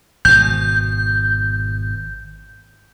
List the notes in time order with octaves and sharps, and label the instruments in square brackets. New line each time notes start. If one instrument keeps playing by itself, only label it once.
[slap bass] G#1 B2 [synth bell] G6